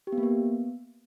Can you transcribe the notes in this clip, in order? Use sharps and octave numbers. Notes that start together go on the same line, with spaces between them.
G4
B3
A#3
B3